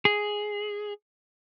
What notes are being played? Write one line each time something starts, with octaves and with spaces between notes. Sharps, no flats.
G#4